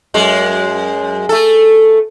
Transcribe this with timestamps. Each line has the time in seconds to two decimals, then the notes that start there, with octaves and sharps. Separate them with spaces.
0.14 F#2 G#3
1.29 A3 A4